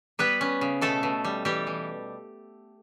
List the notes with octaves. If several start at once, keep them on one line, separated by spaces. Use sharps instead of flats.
G3 B3 B4
C#4
C#3
B2 A3 A4
B2
G3
E3 G3 G4
E3